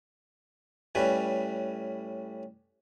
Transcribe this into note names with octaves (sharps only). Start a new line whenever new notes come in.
A2 G3 C#4 B4